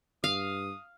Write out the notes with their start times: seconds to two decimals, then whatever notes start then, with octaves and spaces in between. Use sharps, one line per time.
0.24 G2 F5 D#6